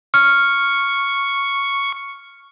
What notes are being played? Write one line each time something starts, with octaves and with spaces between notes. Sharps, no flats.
C#6 F6